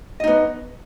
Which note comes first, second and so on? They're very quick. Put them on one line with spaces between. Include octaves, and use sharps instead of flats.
D#5 D#4 B3